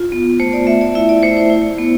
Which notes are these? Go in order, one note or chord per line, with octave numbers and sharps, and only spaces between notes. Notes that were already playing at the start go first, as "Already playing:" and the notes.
Already playing: F4
B3
A3 C5
D5
A3 E5
D5
E4 E5
D5
A3 C5
C5
E4
B3